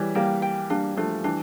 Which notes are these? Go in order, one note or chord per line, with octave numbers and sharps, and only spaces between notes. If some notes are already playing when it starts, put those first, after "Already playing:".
Already playing: E3 G3 C#5
G3 A#3 G5
G5
G3 A#3 D4
F3 A3 D4
E3 G3 D4